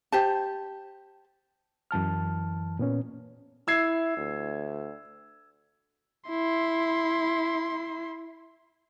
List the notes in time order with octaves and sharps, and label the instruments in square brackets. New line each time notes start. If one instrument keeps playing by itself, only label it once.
[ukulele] G4 C5 A5
[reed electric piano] F#2 E3 A5 F6
A#2 B3 C#4
[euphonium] E4 [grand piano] E6 G#6 C7
[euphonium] D2
[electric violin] E4 C6